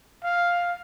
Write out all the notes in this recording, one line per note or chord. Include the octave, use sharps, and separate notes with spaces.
F5